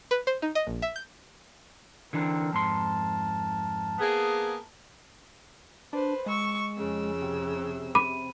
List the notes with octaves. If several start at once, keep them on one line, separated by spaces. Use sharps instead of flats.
B4
C5
D#4
D#5
A#1
E5
G6
D3 E3 C4 D4 A#4
F2 G#2 A#4 A5 C6
A#3 B3 G#4
D4 B4 C5
G#3 C#6 E6
F2 C#3 E6
C3
B5 D6 D#7